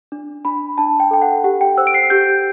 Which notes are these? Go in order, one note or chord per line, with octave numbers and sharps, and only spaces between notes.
D4
D4 B5
D4 A5
G5
A4 G5
F#5
G4 F#5
G5
C5 E6
D7
C7
G4 G6